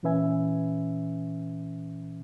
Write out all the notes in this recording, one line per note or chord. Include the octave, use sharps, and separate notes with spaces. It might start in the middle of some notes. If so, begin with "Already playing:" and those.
A#2 E3 C#4 B4 E5 G#5